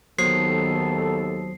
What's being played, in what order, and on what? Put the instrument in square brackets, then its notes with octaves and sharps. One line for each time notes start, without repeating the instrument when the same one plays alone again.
[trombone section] D#2 A4 [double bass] D#3 B3 [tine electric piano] F#3 C5 D#6 [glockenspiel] C7